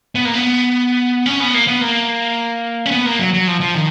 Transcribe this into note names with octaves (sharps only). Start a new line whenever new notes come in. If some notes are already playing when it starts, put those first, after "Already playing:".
B3
A#3
B3
C#4
B3
A#3
B3
A#3
C#4
B3
A#3
F#3
F#3
F3
F3
D#3